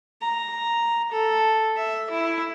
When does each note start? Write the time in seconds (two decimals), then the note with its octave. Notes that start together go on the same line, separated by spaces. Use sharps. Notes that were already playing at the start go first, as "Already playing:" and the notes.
0.22 A#5
1.11 A4
1.76 E5
2.10 E4